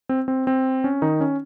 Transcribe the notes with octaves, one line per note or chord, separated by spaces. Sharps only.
C4
C4
C4
C#4
D#3 D#4
C#4